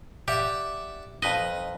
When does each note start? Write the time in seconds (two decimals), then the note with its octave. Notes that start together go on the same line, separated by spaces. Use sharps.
0.28 G4 D5 E5 F#5
1.22 F2 D#4 B4 D#5